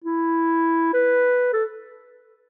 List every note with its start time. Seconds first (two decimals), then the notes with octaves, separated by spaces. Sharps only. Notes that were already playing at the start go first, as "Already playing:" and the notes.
0.04 E4
0.94 B4
1.53 A4